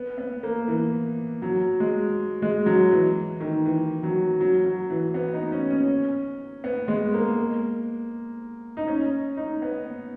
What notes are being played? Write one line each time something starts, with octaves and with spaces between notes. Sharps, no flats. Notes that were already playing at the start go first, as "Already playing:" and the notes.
Already playing: B3
B3
A#3
E3
F#3
G#3
G#3
F#3
E3
D#3
E3
F#3
F#3
F#3
E3
B3
D#4
C#4
C#4
B3
G#3
A#3
D#4
C#4
D#4
B3